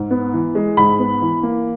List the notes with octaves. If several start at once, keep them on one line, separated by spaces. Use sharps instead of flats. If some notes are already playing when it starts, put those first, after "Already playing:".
Already playing: G#2
B3
E3
G#3
G#2 B5
B3
E3
A#3